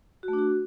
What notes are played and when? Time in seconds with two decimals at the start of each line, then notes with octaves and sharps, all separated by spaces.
0.23 F#4
0.28 A3
0.33 D4
0.38 F#4